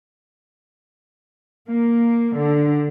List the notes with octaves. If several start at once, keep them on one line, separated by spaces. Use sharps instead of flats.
A#3
D3